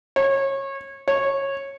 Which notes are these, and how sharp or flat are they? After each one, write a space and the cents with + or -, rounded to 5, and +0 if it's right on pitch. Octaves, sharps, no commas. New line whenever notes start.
C#5 -25
C#5 -15